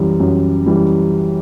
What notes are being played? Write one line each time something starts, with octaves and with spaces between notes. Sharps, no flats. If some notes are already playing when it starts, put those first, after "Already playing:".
Already playing: F#2 E3 G3
F#2
E3 G3